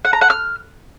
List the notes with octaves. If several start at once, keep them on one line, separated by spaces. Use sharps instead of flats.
F#5
A#5
F#5
F6